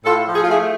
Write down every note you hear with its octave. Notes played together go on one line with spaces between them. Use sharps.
A2 F4 A4
F3
G#4
F4
A3 E4 G#4